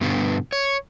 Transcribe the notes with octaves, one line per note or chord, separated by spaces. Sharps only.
G2 B2 D3 B3
C#5